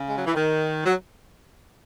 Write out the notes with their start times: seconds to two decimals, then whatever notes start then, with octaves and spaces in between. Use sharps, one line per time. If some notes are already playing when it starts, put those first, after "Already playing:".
Already playing: C#3
0.09 G#3
0.18 F#3
0.26 E3
0.34 D#3
0.85 F#3